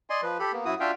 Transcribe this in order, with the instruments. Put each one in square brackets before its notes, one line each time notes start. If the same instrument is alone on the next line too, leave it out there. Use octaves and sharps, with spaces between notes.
[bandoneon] D5 D#5 G#5 C6
F3 B4
G4 A4 B5
A#3 B3
F#2 E4 F#4 D#6
D4 F4 F#4 E5 F5 G5